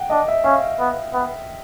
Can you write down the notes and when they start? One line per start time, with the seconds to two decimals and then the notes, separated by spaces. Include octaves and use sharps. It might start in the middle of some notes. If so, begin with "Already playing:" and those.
Already playing: F#5 G5
0.10 D4 D#5
0.28 E5
0.44 C#4 F5
0.80 B3
1.14 B3